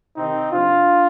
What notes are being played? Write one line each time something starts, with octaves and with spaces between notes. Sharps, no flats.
C3 D#3 C4 D#4
C3 F3 D4 F4